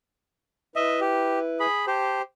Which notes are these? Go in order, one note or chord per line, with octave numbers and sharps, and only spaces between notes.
E4 B4 D#5 E5
G4
G#4 B5
G4 C5 A5